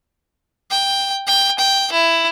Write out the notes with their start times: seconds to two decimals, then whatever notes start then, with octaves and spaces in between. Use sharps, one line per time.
0.71 G5
1.27 G5
1.58 G5
1.92 E4